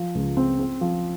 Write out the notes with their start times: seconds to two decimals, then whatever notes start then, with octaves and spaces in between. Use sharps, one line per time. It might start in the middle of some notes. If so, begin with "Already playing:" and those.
Already playing: F3
0.15 C#2
0.37 C4
0.59 C4
0.81 F3